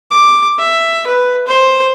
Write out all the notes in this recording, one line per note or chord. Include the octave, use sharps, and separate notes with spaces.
D6
E5
B4
C5